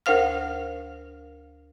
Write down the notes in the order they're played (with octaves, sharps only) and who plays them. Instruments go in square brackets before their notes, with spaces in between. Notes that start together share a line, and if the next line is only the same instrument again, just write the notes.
[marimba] D2 A#4 C5 F5 F6